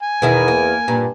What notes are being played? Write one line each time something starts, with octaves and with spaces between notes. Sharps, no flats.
G#5
E2 B2 D#3 E4
A#3
G2 A#2